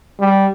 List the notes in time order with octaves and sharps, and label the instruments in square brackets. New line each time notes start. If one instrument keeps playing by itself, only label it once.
[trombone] G3